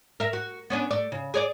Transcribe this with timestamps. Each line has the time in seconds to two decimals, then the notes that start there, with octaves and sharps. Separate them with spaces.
0.20 A#4 E5
0.33 F#4
0.70 B3 C#4 D4
0.91 A3 D5
1.12 C#3
1.34 G#4 C#5 D5